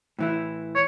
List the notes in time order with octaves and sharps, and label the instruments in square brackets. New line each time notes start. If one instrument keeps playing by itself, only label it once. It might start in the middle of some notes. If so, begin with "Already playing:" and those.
[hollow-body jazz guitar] A2 E3 E4
[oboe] C#5